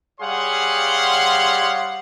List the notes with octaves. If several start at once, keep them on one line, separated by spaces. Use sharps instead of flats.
G3 G#4 C#5 F5 F#5 C6